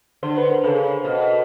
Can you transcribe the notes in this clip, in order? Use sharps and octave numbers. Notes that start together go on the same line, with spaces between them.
D3 C5
B4
A#4
C#3 A4 B4
B2